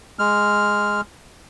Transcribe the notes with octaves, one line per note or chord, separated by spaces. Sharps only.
G#3 F6